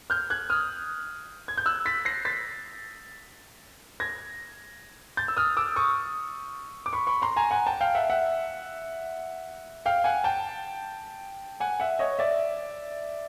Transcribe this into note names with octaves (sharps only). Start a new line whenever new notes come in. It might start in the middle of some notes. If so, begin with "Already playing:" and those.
F6 G6
F#6 G#6
D#6 F6
G#6
G6
E6 F#6
A6 B6
A#6 C7
A6 B6
G#6 A#6
G6 A6
E6
D#6 F6
D6 E6
C#6 D#6
D6
B5 C#6
B5 C#6
A#5 C6
G#5 A#5
F#5 G#5
G5 A5
F5 G5
E5 F#5
E5 F#5
F5 G5
F#5 G#5
G5 A5
F#5 G#5
E5 F#5
C#5 D#5
D5 E5